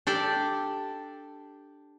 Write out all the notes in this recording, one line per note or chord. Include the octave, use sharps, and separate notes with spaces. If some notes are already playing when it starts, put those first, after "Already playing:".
D4 G4 A4 D5